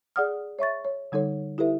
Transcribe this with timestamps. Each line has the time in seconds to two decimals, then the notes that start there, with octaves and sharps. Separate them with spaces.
0.16 G#4 D5 F#5 D#6 F6
0.59 C#5 E5 C#6 A6
0.85 C#5
1.12 D3 G3 D#4 A4 C#5
1.58 E4 G4 A4 B4 E5